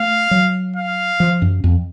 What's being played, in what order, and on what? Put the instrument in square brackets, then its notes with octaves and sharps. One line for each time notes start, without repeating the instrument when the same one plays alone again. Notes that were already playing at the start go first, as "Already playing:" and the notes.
Already playing: [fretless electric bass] A3 [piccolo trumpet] F5
[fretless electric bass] F#3
[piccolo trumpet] F5
[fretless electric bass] F3
F#2
F2